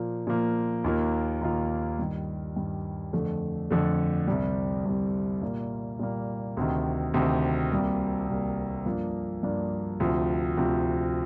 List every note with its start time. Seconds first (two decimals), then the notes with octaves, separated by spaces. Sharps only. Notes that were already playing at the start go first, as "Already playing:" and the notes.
Already playing: A#2 F3 A#3
0.27 A#2 F3 A#3
0.84 D#2 D#3 A#3 F4
1.41 D#2 D#3 A#3 F4
1.99 G2 D#3 G3
2.56 G2 D#3 G3
3.13 F2 D3 A3
3.71 F2 D3 A3
4.28 C2 C3 G3
4.85 C2 C3 G3
5.42 A#2 G3 A#3
5.99 A#2 G3 A#3
6.57 D2 C3 D#3
7.14 D2 C3 D#3
7.71 C2 C3 G3 A#3
8.28 C2 C3 G3 A#3
8.86 G2 F3 A#3 D4
9.43 G2 F3 A#3 D4
10.00 D2 C3 F3
10.57 D2 C3 F3